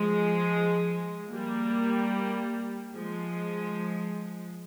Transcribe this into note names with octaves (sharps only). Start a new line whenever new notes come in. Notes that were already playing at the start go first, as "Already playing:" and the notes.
Already playing: F3 G#3
G3 A#3
F3 G#3